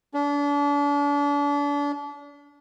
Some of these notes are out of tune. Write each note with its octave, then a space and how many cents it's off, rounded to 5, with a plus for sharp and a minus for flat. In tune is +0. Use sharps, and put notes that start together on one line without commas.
D4 -35